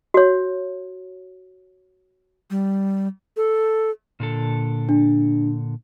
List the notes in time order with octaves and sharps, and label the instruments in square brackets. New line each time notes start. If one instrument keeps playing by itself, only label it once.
[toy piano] F#4 C#5
[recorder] G3
A4
[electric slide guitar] A#2 D3 A4
[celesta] D4